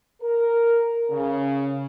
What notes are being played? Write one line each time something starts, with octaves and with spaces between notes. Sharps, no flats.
A#4
C#3